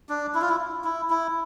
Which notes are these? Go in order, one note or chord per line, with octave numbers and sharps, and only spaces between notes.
D4
E4
F4
E4
E4
E4